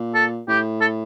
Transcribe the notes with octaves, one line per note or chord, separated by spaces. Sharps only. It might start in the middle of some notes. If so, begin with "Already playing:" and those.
Already playing: A#2
A4
A2 G4
A4